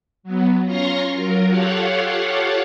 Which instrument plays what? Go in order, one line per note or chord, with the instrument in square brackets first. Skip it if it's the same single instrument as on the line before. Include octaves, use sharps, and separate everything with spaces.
[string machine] F#3 B3
C#4 F4 A#5 C6 C#6 A#6
F#3 F4 A#4
F4 G4 A4 C#5 F5 F#5